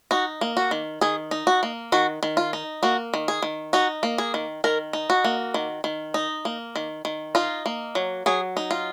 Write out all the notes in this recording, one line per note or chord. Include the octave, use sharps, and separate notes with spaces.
D#4 F#4
A#3
F#4
D#3
D#3 G#4
D#4
F#4
A#3
D#3 F#4
D#3
F4
D#4
A#3 F#4
D#3
G#4
D#3
D#4 F#4
A#3
G#4
D#3
D#3 A#4
D#4
F#4
A#3
D#3
D#3
D#4
A#3
D#3
D#3
D#4 F4
A#3
F#3
F#3 G#4
D#4
F4